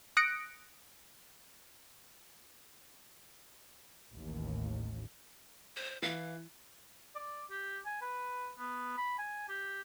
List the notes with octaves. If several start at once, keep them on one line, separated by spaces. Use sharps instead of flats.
D#6 F#6 A#6 C#7 D7
A1 D#2
C5
E3 F5
D5
G4
G#5
B4
B3
B5
G#5
G4